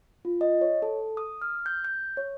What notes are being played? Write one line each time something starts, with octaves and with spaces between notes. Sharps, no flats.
F4
D#5
C#5
A4
D#6
F6
G6
G6
C#5